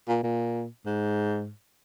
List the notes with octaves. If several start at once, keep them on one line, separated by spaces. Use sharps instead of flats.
A#2
A#2
G#2